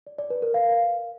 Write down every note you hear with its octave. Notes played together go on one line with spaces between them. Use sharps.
D5
D5
B4
A#4
F5